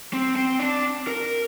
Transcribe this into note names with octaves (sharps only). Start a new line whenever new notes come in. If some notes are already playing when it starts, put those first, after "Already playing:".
C4
C4
D4
A#4